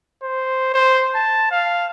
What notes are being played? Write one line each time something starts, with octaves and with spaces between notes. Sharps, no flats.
C5
C5
A5
F5